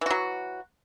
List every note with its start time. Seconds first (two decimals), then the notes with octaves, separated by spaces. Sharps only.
0.01 E3
0.06 F#4
0.10 F#3